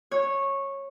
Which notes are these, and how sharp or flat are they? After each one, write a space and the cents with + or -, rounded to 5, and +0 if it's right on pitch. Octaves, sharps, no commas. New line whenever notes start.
C#5 -15